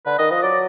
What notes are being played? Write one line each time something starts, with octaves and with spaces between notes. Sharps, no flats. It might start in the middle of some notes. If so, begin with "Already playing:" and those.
D3 B4
D#3 D#5
F3 D#5
F#3 D5